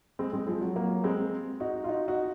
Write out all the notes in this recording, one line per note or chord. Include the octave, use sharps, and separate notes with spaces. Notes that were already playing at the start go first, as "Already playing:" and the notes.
G#3 C4
G#3 C4
F3 G#3
F#3
F#3 A#3
G#3 C4
D#4 F#4
F4
D#4 F#4
D#4 F#4